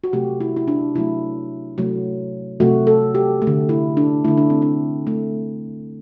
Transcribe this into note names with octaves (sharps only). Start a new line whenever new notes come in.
F#4
C3 F#3 A3 G4
E4
E4
D4
C3 F#3 A3 E4
C3 F#3 A3
C3 F#3 A3 F#4
A4
G4
A3
D3
E4
D4
D3 A3 E4
D4
C4
D4
D3 A3